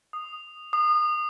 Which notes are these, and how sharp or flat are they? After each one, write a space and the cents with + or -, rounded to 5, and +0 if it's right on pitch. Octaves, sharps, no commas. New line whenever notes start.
D#6 -15
D#6 -35